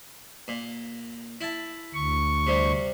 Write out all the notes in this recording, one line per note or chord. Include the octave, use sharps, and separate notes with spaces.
A#2
E4 A5
D2 C#6
C3 G3